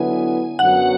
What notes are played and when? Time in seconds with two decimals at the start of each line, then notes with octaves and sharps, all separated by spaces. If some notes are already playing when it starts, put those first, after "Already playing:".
Already playing: D3 F#3 B3 E4 B4 G#5
0.59 F#2 D3 F#3 B3 F#5